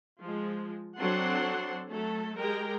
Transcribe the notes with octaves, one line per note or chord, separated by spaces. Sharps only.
F3 G#3
F#3 C4 D4 A4 F#5 C6
F#3 A3 A4
G#3 G4 A#4 G5 A#5